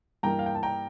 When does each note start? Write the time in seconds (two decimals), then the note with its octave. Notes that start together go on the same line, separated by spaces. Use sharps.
0.23 G2 E3 A#3 G5 A#5
0.39 F5
0.46 G5
0.55 A5
0.63 G5 A#5